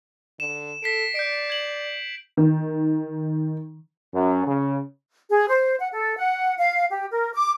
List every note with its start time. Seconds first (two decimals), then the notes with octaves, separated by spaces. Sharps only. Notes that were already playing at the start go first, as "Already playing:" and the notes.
0.40 D3 E7
0.83 A4 B6 C7 D7
1.15 D5 G6 B6 D7
1.50 G#6 F#7
2.37 D#3
4.13 F#2
4.46 C#3
5.30 G#4
5.49 C5
5.79 F#5
5.92 A4
6.18 F#5
6.57 F5
6.90 G4
7.10 A#4
7.34 D6